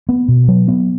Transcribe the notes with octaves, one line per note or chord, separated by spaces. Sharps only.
B3
B2
F#3
B3